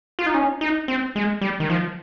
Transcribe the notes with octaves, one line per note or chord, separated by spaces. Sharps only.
F4
D#4
C#4
D#4
C4
G#3
G3
D#3
F3